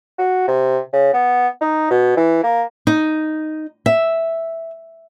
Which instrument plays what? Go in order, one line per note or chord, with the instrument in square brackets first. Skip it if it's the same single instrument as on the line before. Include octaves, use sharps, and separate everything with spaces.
[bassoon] F#4
C3
C#3
B3
D#4
B2
E3
A#3
[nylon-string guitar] D#4
E5